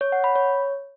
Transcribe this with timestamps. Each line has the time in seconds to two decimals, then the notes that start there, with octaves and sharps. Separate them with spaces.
0.01 C#5
0.12 F#5
0.24 B5
0.36 C#5